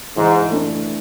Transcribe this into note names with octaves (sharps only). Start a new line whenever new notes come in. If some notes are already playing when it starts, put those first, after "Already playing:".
G#2 E3
A3 D4